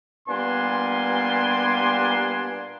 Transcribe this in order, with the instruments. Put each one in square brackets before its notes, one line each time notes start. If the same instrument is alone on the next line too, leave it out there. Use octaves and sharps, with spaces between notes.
[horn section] A#2 G3 B3 D4 G#5 C6